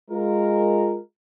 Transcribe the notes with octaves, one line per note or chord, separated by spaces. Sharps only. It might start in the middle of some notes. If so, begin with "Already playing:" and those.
G#3 F4 A#4